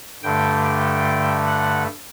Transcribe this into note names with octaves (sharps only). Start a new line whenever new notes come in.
G2 D3 A3 G5
G5
F#5